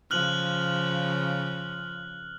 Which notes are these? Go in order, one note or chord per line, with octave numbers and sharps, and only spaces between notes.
C#3 F3 F6 F#6 F#7